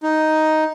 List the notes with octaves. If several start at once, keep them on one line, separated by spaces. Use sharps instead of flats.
D#4